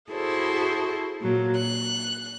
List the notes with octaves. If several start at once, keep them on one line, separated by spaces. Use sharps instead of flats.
E4 F#4 G#4 A4 C5
A#2 F#3
F#6